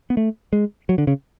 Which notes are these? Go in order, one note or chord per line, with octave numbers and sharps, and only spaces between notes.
B3
A3
G#3
F#3
D3
C#3